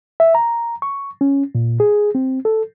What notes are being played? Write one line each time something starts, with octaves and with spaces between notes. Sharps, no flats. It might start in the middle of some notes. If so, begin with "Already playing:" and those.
E5
A#5
C#6
C#4
A#2
G#4
C4
A4